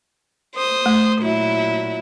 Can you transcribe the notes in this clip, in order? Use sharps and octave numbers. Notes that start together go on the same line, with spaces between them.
C5 D#6
A3
A#2 F#3 E4